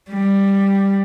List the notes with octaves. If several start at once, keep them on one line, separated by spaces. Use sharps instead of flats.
G3